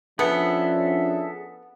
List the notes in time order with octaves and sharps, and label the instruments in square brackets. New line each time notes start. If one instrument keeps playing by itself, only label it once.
[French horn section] F3 C#4 D4 [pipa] B3 [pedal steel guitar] G#4 A4 F#5 [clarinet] E5